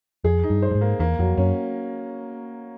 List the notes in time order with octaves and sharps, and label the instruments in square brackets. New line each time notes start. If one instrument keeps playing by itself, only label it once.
[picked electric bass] F2 [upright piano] G#4
[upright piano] D#4
[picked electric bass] G2
[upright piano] C5
[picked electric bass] G2
G#2
[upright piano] A#3
[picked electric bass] E2 [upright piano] A#3
[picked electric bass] F2 [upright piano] F#3
[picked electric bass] F#2 [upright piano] C#4